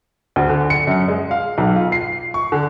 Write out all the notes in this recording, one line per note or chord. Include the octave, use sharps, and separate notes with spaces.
D2
D3
C#7
F#2
G#3
F5
B1
F4
C7
C#6
D3